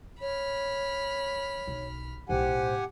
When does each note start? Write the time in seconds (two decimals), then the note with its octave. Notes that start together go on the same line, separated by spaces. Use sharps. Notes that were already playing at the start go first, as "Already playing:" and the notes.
0.21 C#5 B5 F6
1.67 B1
2.29 B1 A2 G4 C5 F#5 G#5